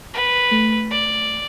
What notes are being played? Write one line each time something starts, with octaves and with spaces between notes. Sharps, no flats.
B4
A3
D5